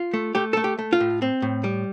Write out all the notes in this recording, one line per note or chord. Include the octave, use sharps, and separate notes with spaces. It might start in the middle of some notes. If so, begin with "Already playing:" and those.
Already playing: F4
A3
A3 G4
A3 A4
G4
A3
F4
A2
C4
A2
G3